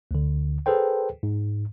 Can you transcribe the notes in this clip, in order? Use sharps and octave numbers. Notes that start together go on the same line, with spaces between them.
D2 D3
G#4 A4 B4 C5 G5
G#2